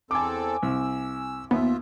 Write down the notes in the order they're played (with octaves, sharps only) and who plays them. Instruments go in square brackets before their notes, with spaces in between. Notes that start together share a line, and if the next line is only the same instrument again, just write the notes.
[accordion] E2 C4 A4 [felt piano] G#5 D6
[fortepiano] C2 [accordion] E6
[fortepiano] D#2 [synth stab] B3 [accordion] F4 E5